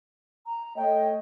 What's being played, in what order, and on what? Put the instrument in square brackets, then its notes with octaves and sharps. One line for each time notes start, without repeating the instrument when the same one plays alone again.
[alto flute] A#5
[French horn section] A3 C#5 D#5 [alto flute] G5